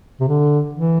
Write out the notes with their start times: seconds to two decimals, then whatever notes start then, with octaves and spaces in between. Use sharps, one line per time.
0.21 C3
0.28 D3
0.74 E3